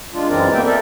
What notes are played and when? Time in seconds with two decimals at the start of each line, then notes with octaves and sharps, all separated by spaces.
0.13 G#3 D4 F4
0.28 F#2 E3 G#3 C4 A#4 D5
0.53 A#3 B3 E5 G5
0.66 A4 A#4 D5 E5